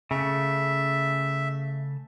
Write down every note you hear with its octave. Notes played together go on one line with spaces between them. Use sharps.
C#3 A3 E5